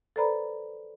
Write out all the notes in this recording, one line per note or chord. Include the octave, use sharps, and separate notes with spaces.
A4 B4 C5 D5 A#5 B5